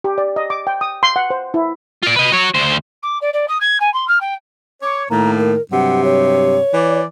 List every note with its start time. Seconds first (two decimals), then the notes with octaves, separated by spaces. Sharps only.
0.04 G4
0.18 D5
0.36 D#5
0.50 D6
0.67 G5
0.81 D#6
1.03 C6
1.16 F#5
1.30 C5
1.54 E4
2.03 F4 D5
2.16 B4 D#5
2.32 F#4 C#5
2.55 D2 C5
3.02 D6
3.21 D5
3.33 D5
3.48 D#6
3.60 G#6
3.80 G#5
3.94 C6
4.08 F6
4.20 G5
4.83 C#5 D6
5.10 A2 D#3 A#3 A#5
5.38 A#4
5.72 G2 C3 F#3 F#5
6.04 C#5
6.74 E3 D5